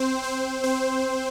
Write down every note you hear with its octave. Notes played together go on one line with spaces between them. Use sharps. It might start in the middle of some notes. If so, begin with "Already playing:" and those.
Already playing: C4 C5
C4 C5
C4 C5